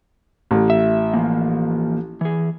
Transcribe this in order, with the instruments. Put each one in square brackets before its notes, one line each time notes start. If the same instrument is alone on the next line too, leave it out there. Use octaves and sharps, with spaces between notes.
[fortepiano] A1
[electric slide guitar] E5
E3 F3 A#3
E3 G#4